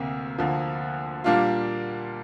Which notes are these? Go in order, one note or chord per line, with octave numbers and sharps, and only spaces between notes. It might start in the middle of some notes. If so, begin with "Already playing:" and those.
Already playing: D2 C3 A#3
D2 D3 F3 A#3
A#2 G3 A#3 D4 F4